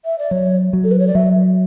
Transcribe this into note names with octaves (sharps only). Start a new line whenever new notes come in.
E5
D5
F#3 C#5
F#3
A4
B4
C#5
D5
F#3 E5